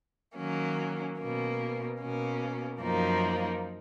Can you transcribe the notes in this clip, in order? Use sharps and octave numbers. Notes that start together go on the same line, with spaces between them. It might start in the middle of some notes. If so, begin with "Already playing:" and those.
D#3 F#3 A#3 C#4
B2 A#3 C#4
B2 A#3 C#4
F#2 F3 A#3 D#4